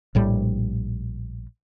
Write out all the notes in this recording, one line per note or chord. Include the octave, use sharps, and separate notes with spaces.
A#1 A2 G3